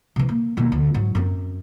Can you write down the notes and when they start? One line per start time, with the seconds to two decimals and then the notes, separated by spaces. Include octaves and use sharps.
0.16 C3 E3
0.29 A#3
0.57 D#2 B2
0.72 D2
0.94 G#2 F#3
1.15 F#2 C4